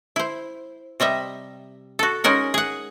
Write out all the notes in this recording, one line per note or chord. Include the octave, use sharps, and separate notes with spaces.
E4 C5
C3 G3 D#5 E5
F#4 A4
G#3 C#4 D#4 A#4 F#5
G#4 F#5